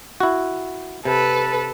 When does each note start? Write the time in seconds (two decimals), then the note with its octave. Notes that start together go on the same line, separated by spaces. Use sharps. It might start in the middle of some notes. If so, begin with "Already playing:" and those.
0.20 E4 F#4
1.05 C3 A4 B4